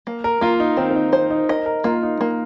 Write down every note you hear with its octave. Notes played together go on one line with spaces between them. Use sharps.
A#3
A#4
A#3 F4
D#4
D#3 C4
C4
D#4
C4 C5
D#4
A#4 D#5
A#4
A#3 F4
D#4
A#3